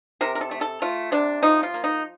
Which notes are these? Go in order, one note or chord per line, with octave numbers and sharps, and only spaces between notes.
C3 A#4
A#4
A4
A3
A4
A3 F4
C3 D4
F3 D#4
F4
A#3
D#4